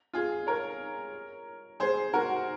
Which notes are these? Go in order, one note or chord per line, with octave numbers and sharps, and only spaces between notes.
F4 G#4
A#4 C#5
G#4 C5
F#4 A#4